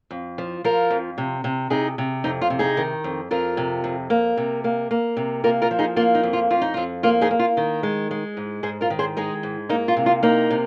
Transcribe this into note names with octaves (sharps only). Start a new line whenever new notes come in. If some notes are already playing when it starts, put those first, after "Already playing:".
F2
F3
F3 F4 A#4
F2
C3
C3
C3 D#4 G#4
C3
F2 D#4
F4
C3
D#4 G#4
D#3
F2
F2 F4 A#4
C3
F2
A#3
C3
A#3
A#3
C3
A#3 F4 A#4
F4 A#4
F3
D#4 G#4
A#3 F4
D#4
F2
F4
F2 F4
D#4
F2 F4
A#3 F4
D#4 G#4
A#3
F4
D#3
G#3
G#3
G#2
G#2 G#4 C5
F4 A#4
D#3
G#4 C5
G#3 D#4 G#4
G#2
A#3 D#4
F4
C3
F4
A#3 D#4
C3